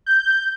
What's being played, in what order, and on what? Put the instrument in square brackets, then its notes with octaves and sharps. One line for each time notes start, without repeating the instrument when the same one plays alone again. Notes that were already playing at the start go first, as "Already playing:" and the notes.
[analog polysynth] G6